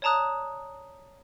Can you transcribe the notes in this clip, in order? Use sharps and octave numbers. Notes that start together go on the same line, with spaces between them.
C#5 D5 A5 A#5 D#6 F#6